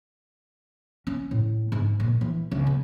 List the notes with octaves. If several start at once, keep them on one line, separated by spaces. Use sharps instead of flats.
C#4
A2
G#2
A#2
E3
C#2
C#3